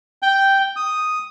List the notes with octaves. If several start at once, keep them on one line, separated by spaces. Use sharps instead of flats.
G5
D#6